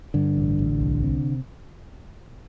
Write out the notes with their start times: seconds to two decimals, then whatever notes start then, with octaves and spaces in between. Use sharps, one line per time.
0.14 G2 D3
0.37 A1
0.59 A1
0.81 C2
1.03 C3